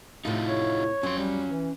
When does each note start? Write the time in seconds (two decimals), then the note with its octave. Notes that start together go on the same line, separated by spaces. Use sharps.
0.25 F2 A2 C3 D#4 F4
0.48 C#5
1.03 F2 F#3 C#4 C6
1.18 G3
1.46 E3